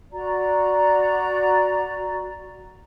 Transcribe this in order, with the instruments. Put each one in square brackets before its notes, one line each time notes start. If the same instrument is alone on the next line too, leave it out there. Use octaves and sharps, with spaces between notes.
[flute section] F#4 D5 A#5